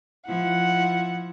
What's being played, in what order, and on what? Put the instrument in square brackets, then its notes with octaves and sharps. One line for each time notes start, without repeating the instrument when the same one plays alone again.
[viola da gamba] F3 E4 [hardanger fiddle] F#5